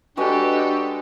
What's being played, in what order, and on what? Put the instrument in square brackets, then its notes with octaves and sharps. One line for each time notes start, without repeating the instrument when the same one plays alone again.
[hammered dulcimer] G#3 F#4 B4 [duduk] D4 [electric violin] G4 A4